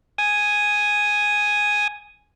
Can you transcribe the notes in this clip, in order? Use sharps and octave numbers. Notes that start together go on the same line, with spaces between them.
G#5 D#6